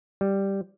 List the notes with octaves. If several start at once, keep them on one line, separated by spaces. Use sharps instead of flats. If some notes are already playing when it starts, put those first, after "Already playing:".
G3